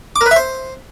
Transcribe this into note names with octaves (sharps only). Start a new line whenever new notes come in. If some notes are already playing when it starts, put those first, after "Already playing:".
D6
A#4
B4
E5
C5